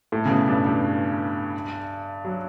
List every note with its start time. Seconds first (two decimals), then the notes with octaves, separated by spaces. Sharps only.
0.12 A2
0.25 C#3
0.30 B2
0.47 G2
0.66 G2
2.25 F#3